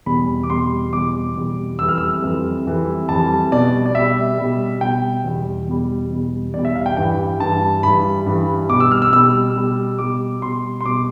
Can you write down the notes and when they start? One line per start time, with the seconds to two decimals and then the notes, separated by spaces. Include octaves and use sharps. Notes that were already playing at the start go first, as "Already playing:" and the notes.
0.06 E2 B2 G3 B5
0.43 D6
0.49 E2 B2 G3 C6
0.93 E2 B2 G3 D6
1.36 E2 B2 G3
1.79 F2 E3 G3 E6
1.88 F6
1.98 E6
2.22 F2 E3 G3
2.65 F2 E3 G3
3.08 F2 E3 G3 A5
3.52 B2 G3 D5
3.86 D5
3.95 B2 G3 E5
4.38 B2 G3
4.81 B2 G3 G5
5.24 E2 B2 G3
5.67 E2 B2 G3
6.10 E2 B2 G3
6.54 E2 B2 G3 D5
6.65 E5
6.75 F5
6.86 G5
6.97 G2 E3 G3 G5
7.40 G2 E3 G3 A5
7.83 G2 E3 G3 B5
8.26 G2 E3 G3
8.70 B2 G3 D6
8.80 E6
8.91 F6
9.02 E6
9.13 B2 G3 E6
9.56 B2 G3
9.99 B2 G3 D6
10.42 B2 G3 C6
10.81 C6
10.85 B2 G3 D6